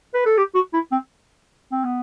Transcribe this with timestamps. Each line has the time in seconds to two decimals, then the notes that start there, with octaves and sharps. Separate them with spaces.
0.14 B4
0.26 A4
0.37 G4
0.55 F#4
0.73 E4
0.92 C4
1.72 C4
1.85 B3